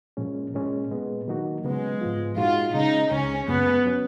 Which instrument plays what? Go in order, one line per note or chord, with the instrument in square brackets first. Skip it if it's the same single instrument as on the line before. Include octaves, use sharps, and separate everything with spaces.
[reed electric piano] A#2 F3 G#3 C#4
A#2 G#3 C#4
A#2 G#3 B3
D#3 F#3 A#3 D#4 F#4
[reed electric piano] C#3 F#3 B3 [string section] G#3
[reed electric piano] G#2 F3 B3 F4
[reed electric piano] A#2 G#3 D#4 F#4 [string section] F4
[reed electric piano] C#3 G#3 C#4 [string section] D#4
[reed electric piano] C#2 C#3 G#3 [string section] C#4
[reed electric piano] F#2 C#3 G#3 [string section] B3
[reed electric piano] F#3 C#4